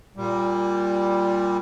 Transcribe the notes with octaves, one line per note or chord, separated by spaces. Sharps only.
A#2 G3